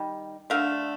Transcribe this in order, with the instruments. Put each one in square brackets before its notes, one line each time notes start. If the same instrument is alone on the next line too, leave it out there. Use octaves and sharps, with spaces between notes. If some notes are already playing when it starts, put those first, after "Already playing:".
Already playing: [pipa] D#3 G3
D3 A3 F5